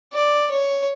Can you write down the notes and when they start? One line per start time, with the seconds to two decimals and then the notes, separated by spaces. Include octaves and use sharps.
0.13 D5
0.51 C#5